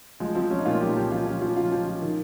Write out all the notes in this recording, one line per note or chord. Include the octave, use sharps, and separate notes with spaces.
F3 G#3
F3 C4
F3 C#4
D#4
A#2 F4
F3 G4
F3 G4
F3 F4
F3 C#4
F3 F4
F3 F4
F3
F3
D#3